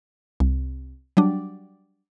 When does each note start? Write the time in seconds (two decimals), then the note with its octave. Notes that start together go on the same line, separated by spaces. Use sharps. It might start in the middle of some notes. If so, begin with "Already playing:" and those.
0.40 C2
1.17 F#3 G3 D4